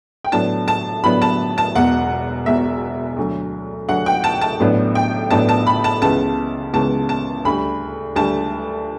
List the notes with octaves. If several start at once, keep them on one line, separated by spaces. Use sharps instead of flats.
G5
A2 F#3 B3 D4 A5
A5
A2 F#3 B3 D4 B5
A5
A5
E1 E2 B2 F#5
E1 E2 B2 E5
D2 D3 F#3
D2 D3 F#3 F#5
G5
A5
A5
A1 A2 F#3 B3 D4
G5
A1 A2 F#3 B3 D4 A5
A5
B5
A5
C#2 C#3 E3 B3 A5
C#2 C#3 E3 B3 A5
A5
D2 D3 G3 B5
D2 D3 G3 A5